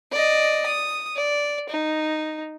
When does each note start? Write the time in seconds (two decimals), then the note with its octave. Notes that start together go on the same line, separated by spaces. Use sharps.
0.11 D5 D#5
0.66 D#6
1.15 D5
1.69 D#4